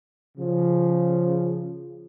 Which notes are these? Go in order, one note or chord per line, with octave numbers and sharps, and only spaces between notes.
C#3 F3